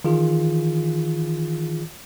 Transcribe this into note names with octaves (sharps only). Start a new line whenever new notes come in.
D#3 E3 F4 G#4